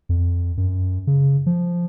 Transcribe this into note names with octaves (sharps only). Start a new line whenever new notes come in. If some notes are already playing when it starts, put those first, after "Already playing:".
F2
F#2
C#3
F3